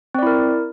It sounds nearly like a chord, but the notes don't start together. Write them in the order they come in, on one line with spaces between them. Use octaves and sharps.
C4 D5 E4 A#4